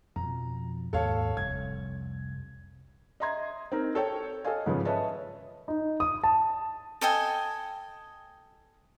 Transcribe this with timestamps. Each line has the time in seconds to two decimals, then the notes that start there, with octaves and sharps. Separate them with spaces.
0.16 F2 B2 F3 A#5
0.93 D#2 G#2 A#3 A4 C#5 F5
1.37 F1 C2 G#6
3.20 D#5 E5 A#5 C6 G#6
3.72 C4 D#4 A#4
3.95 A4 C#5 G5
4.44 A4 C#5 D#5 F5 G#5
4.66 G#2 C#3 F3 B3
4.85 B4 C#5 D#5 E5 A5
5.68 D#4
6.00 D#6
6.24 A5
7.01 A4 D#5 G5 G#5